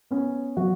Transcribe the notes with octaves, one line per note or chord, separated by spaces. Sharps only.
B3 C#4
F#3 F#4